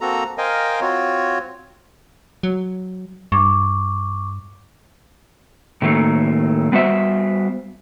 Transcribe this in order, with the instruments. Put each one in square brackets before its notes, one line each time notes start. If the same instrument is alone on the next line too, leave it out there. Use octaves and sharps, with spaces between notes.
[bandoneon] A#3 C4 F#4 A4 A#5
A#4 C5 D#5 F5 G5 G#5
C4 F4 F#4 C#5
[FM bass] F#3
[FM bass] G2 [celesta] C#6 D6
[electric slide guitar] A2 D#3 F#3 A3 A#3
G3 B3 F#4 C5 E5